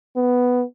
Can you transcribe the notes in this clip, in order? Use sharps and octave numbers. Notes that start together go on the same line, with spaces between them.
B3